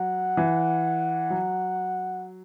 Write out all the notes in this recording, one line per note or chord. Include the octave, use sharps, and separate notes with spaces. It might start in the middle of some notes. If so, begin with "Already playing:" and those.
Already playing: F#3 F#5
E3
F#3